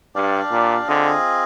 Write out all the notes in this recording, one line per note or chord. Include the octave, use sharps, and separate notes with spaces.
G2 D4 G4 D5 F5
A#2
D3 C4 F4 G#4 D#5